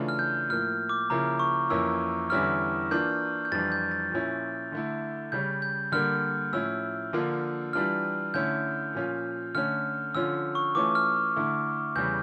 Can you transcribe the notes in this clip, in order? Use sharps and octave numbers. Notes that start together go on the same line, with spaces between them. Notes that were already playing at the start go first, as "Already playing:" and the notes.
Already playing: C#3 E3 A3 D4 F4
F6
G6
A2 F3 A#3 F6
D6
C#3 F3 A#3 E4 A#5
C#6
F2 E3 A#3 C#4 E4 E6
E2 D3 G3 C#4 E4 F6
E3 A#3 D4 F4 G6
G6
F2 E3 G3 D4 F4 A6
G6
A6
A#2 F3 C#4 E4
D3 A3 E4
C#3 G3 C#4 G6
G6
D3 G3 A#3 F6
A2 F3 C#4 E4 E6
D3 F3 A#3 D4 F4
E3 G3 D4 F4 F6
D3 A3 C#4 E4 G6
A#2 F3 C#4 F4
D3 A3 C#4 F6
D3 F3 C#4 F4 E6
C#6
E3 A3 C#4 F4 D6
F6
D3 A3 E4
E2 C#3 G3 G6